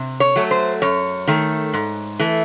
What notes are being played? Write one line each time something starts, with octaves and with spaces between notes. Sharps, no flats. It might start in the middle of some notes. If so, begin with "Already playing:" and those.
Already playing: C3
C#5
F#3 A3
C5
F#2 C#5
D#3 A3
G#2
E3 A3